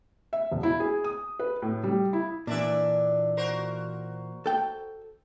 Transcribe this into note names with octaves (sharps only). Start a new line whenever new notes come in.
E5
E1
E4
G#4
D#6
B4
A2
G3
E4
A#2 E3 D4 D5 E5
F#4 A#4 C5
A4 G5